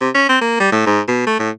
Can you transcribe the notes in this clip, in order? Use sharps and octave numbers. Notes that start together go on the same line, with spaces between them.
C3
C#4
C4
A#3
G3
A2
G#2
B2
A3
A2